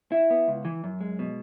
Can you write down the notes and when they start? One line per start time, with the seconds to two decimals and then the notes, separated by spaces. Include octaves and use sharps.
0.12 E4
0.30 B3
0.48 C#2
0.65 E3
0.84 F#2
1.01 G#3
1.19 B2